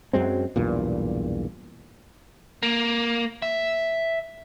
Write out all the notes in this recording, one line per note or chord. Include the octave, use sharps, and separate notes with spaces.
F#2 F#3 G#3 C4
B1 E2 G2 A#2
A#3
E5